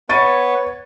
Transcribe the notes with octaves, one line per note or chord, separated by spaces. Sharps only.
B3 B4 C#5 C#6 A6 D#7